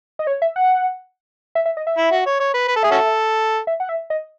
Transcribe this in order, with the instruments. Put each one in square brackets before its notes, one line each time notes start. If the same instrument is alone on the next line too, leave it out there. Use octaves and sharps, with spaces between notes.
[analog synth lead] D#5
C#5
E5
F#5
E5
E5
D#5
E5
[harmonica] E4
F#4
C#5
C#5
B4
B4
A4
[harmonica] G#4 [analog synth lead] E5
[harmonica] C#4 F#4 A4
[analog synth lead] E5
F#5
E5
D#5